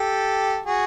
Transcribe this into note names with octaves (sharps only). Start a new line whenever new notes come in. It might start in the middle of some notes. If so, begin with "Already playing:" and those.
Already playing: G4 A4
F#4 G#4